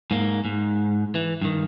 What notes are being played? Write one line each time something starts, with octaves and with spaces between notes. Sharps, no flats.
G#2 A#3
G#2
E3
G2 D#3